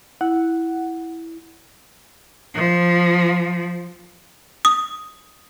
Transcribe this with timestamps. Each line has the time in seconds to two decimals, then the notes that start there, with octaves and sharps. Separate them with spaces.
0.21 E4 F#5
2.55 F3
4.65 D#6